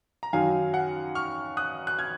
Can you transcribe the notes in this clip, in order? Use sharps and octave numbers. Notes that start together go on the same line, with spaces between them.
A#5
F#2 D#3 F#3 F5 G#5
F#5
C#6 F6
D#6 F#6
F#6
F6 G#6